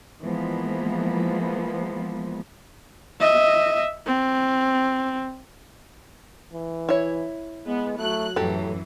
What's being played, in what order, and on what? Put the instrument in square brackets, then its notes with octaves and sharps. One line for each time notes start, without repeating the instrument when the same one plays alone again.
[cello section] E3 F3 G#3 A#3 B3
[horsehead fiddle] D#5 E5
C4
[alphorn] E3
[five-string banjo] E4 C#5
[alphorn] G#3 [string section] B3
[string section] F#3 F#6 [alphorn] A3
[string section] F#2 E3 [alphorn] A2 [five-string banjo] F#3 G4 A4